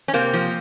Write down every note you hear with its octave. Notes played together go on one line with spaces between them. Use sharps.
C#4
C3 A#3 C4
F3